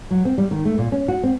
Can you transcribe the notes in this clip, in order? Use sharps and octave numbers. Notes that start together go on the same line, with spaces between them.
F#3
C4
G3
D#3
A3
A#2
C#4
F#4
C4